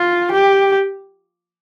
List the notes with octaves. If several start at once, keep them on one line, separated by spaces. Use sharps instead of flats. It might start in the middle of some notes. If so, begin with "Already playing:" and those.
Already playing: F4
G4